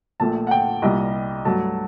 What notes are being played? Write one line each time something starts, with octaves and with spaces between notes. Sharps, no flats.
A#1 A#2 A3 A5
F#5
G5
C2 A#2 G3 D#5
G2 F#3 A3 A5